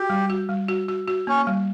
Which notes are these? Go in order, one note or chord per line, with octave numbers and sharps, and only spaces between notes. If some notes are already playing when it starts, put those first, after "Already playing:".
Already playing: F#4 G4
G3
F#4
G3
F#4
F#4
F#4
A#3 C#4
G3